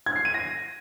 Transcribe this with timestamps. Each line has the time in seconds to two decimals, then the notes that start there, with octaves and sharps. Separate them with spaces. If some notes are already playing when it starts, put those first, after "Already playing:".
0.06 G#6
0.16 C7
0.25 D#7
0.34 A#6